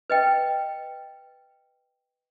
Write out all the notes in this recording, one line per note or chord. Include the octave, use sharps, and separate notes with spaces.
B4 D#5 G5